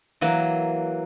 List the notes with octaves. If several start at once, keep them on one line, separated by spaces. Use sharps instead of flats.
E3 F#3 A#3